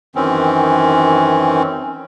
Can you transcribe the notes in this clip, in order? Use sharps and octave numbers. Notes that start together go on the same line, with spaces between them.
F#2 D#3 E3 C4 C#4